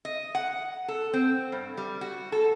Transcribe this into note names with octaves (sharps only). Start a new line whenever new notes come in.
D#5
F#5
A4
C4
G2
G3
F#4
A4